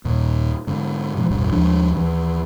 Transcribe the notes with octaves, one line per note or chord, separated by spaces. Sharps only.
D#2 A#2
G#2 D3
B2 F3 G#3
A1 E2 G2 B2
D#2 F3 G#3 D4
D#2 E3